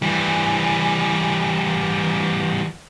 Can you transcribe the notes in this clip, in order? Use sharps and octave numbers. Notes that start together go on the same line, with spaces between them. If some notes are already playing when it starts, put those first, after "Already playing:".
E3 G3